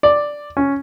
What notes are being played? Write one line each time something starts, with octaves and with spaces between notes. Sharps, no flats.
D5
C#4